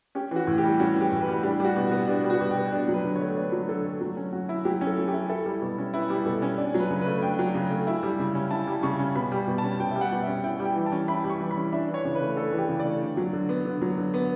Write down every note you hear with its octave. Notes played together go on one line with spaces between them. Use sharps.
C#4 G4
E3 F#4
A2
G4
G3
C#4 F#4
E3 G4
A2
B4
G3
D4 G4
G3 F#4
B2
B3 F#4
D4 G4
G3
F#4
B2
G4
B3
D4 G4
F#3
B4
D3
C#5
A3
D4 B4
F#3
D3 A4
A3
F#3
C#4
F#3 F#4
E4
F#3 G4
C#4
A4
F#3
G4
E4
E4 A4
G3
B2
C#4
E4 B4
G3
B2 A4
C#4
D4 D5
F#3
B4
C#3
B4
A3
D4 G5
F#3
C#3
A3
E4
G3
C#3
C#4
E4 A5
G3
C#3 C#6
C#4
B2 B5
G3
B2
A5
C#4
B2 G5
G3 E5
F#5
B2
C#4 E5
E4 G5
G3
G5
E3
A5
C#4
E4 B5
G3
C#6
E3
B5
C#4
D4 E5
E3
C#5
C#3
B4
A3
D4 A4
E3
G4
C#3
A3 D5
D3
F#3
D3
B3
D3
F#3
D3
B3